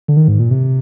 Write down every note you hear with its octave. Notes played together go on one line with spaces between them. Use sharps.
D3
D#3
G#2
A#2
C3